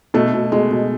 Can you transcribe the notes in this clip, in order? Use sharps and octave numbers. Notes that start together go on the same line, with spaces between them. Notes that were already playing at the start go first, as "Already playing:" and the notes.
B2 A3
B2
B2 G#3
B2